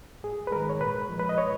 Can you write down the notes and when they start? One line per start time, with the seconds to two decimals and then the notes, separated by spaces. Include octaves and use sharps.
0.23 G#2 G#4
0.47 B4
0.52 D#3 G#3 A#4
0.69 C#5
0.81 A#2 B4
1.09 F3 G#3
1.19 B4
1.29 D#5
1.38 C#5